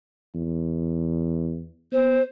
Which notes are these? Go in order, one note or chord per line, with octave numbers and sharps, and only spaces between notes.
E2
B3 C5